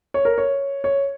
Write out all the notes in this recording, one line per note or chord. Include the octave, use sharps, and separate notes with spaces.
C#5
A#4
C#5
C#5